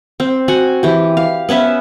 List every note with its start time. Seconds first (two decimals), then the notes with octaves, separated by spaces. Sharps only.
0.20 C4
0.48 F#4 F#5 G#5
0.83 E3 G4
1.17 F5
1.49 B3 C#4 B4 E5